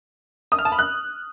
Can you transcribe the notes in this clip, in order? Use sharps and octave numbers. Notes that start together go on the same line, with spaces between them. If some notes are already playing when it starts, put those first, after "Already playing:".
D#6
F6
A5
B5
F#6